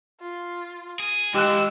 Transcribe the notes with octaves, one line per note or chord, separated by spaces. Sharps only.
F4
G#4
E3 F3 G#3 G4 E6 F#6